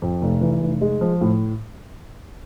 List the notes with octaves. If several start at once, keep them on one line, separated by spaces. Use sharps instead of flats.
F2
F1
E3
F1
G#3
F3
A2